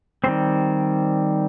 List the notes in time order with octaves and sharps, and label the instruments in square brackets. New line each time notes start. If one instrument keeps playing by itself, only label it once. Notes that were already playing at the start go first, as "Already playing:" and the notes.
[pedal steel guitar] D#3 G3 C4 C5